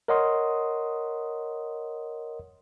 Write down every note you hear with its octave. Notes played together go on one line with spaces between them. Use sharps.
A#4 C#5 D#5 F#5 C6 D#6